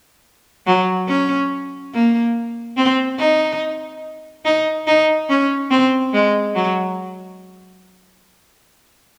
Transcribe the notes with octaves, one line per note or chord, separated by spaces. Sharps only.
F#3
C#4
A#3
C4
D#4
D#4
D#4
C#4
C4
G#3
F#3